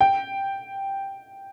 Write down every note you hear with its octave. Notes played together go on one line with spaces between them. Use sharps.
G5